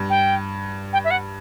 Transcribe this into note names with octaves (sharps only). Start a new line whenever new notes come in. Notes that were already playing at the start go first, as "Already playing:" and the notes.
Already playing: G2
G5
G5
E5
F#5